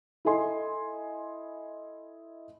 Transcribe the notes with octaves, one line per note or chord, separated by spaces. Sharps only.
E4 A4 D#5 G#5 C6